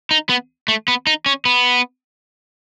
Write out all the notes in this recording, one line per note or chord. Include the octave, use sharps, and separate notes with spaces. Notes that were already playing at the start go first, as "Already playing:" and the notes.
D#4
B3
A3
B3
D#4
C#4
B3